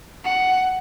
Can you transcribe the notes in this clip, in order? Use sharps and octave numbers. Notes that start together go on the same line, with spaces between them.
F#5